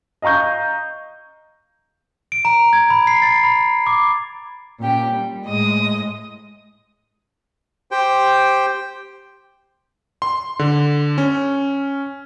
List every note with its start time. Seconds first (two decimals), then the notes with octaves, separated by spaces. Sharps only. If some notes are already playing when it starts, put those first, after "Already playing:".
0.22 D#5 F5 A#5 C#6 G6
2.32 D7
2.45 A#5
2.73 G#6
2.90 B5
3.07 C7
3.22 A6
3.44 B5
3.87 D6
4.79 A#2 C#4 G4 G5
5.09 G3
5.44 A2 G#3 D#5 D#6
7.91 G4 C5 G5
10.22 C6
10.59 D3
11.18 C#4